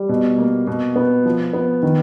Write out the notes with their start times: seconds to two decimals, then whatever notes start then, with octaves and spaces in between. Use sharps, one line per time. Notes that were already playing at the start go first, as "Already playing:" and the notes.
Already playing: G3
0.09 B2
0.38 A#3
0.67 B2
0.96 B3
1.25 F3
1.53 B3
1.83 D#3